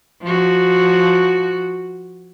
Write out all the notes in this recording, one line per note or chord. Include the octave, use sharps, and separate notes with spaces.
F3 F#4